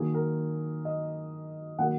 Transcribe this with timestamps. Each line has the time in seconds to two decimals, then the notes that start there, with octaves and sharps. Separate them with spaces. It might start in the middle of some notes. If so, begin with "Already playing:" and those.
Already playing: D#3 F#3 A#3 G#4
0.14 A#4
0.85 D#5
1.79 D#3 F#3 A#3 F#5